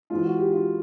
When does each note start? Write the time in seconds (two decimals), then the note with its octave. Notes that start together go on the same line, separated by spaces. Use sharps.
0.10 G#2 E3 G#3 F4
0.24 F#4
0.38 G4
0.52 F4